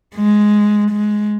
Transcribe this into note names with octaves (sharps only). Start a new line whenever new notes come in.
G#3
G#3